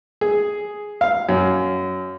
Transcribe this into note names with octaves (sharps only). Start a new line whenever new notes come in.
G#4
F5
F#2